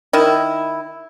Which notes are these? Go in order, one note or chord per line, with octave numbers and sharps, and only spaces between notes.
D#3 E4